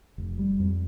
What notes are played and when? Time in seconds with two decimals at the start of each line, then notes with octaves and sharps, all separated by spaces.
0.18 F1
0.39 G3
0.60 F2